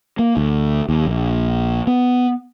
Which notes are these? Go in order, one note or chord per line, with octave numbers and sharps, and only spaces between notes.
A#3
D2
D#2
A#1
B3